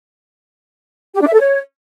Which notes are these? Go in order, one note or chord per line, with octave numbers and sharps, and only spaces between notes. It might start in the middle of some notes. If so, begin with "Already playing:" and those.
G4
D4
E5
A4
C#5